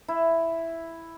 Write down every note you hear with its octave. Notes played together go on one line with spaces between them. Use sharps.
E4